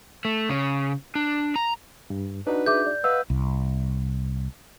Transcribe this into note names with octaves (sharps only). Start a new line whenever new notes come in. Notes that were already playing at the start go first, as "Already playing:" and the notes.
A3
C#3
D4
A#5
G2
D4 D#4 F#4 B4
G#4 E5 D6 G6
D5
B4 D#5 F5 F#5 E6
C2